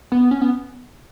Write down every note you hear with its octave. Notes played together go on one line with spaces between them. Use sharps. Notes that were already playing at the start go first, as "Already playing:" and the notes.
B3
C#4
B3